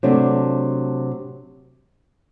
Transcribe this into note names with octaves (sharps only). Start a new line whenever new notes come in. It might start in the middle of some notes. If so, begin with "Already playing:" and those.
C3 F#3 A3 D4